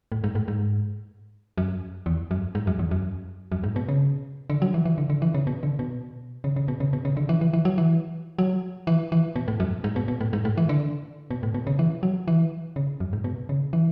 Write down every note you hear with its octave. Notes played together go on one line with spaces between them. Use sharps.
A2
G#2
A2
G#2
F#2
E2
F#2
G#2
F#2
E2
F#2
F#2
G#2
B2
C#3
D3
F#3
E3
E3
D3
D3
E3
C#3
B2
D3
B2
C#3
C#3
B2
C#3
B2
C#3
D3
E3
E3
E3
F#3
E3
F#3
E3
E3
B2
A2
F#2
G#2
B2
B2
A2
G#2
A2
E3
D3
B2
A2
B2
C#3
E3
F#3
E3
C#3
F#2
G#2
B2
C#3
E3